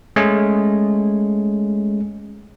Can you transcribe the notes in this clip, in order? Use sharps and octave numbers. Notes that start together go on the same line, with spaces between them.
G#3 A3 C#4